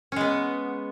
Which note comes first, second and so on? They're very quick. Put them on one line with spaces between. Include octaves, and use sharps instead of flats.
C#4 G#3 B3